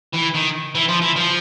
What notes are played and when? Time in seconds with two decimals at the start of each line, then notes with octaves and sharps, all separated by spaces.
0.13 E3
0.34 D#3
0.75 E3
0.88 F3
1.02 E3
1.16 F3